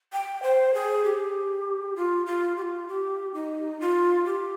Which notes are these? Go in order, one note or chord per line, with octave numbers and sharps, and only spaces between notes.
G5
C5
G#4
G4
F4
F4
G4
F4
G4
D#4
F4
G4